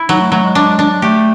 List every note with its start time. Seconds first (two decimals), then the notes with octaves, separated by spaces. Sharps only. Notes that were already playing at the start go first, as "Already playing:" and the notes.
Already playing: E4
0.09 F#3 D#4
0.20 A3
0.32 F#3 A3
0.44 G#3
0.55 G#3 D4
0.79 D4
1.02 A3 G4